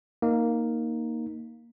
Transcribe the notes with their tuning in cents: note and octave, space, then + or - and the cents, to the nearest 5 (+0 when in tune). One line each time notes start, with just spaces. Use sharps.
A#3 +0 D#4 +0